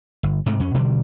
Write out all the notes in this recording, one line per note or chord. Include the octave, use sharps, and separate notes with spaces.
G1
G#2 C3 A3
F2 C#4
B2 D3 D#3 G3